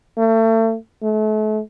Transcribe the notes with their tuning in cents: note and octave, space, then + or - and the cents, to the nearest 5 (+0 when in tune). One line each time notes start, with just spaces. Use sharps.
A3 +35
A3 -35